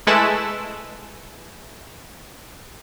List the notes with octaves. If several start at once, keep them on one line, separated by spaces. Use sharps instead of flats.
G#3 A3 E4 A4 B4 E7